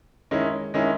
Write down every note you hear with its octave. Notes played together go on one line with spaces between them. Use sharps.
D#3 G#3 C#4 E4
D#3 G#3 C#4 E4